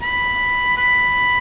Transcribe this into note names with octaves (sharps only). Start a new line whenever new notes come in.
B5
B5